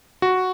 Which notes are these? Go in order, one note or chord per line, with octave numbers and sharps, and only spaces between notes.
F#4